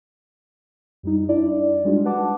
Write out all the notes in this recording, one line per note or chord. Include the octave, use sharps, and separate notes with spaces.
F#2 G3 D#4
D4 E4 D5
G3 G#3 D4 D#4 F4 F#4
B4 F#5 A5 D6